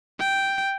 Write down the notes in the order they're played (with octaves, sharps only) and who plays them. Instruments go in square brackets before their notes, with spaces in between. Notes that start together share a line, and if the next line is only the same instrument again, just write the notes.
[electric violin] G5